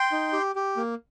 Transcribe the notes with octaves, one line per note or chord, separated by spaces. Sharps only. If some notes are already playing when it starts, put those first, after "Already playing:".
Already playing: G5 C6
D#4
G4
G4
A#3